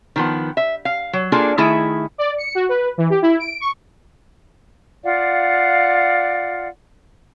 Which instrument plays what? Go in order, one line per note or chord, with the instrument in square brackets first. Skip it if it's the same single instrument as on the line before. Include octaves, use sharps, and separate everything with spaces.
[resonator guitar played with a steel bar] D#3 F3 B3
E5
F5
F#3
A#3 D4 F4 G#4 A4
D#3 A3 E4 G#4 E5
[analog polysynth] D5
C#7
F#4
B4
E3
G4
E4
D7
C#6
[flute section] F4 D5 F5 F#5